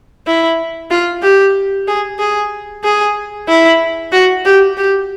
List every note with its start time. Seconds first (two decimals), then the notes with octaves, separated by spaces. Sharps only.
0.27 E4
0.90 F4
1.23 G4
1.88 G#4
2.19 G#4
2.84 G#4
3.48 E4
4.12 F#4
4.45 G4
4.77 G4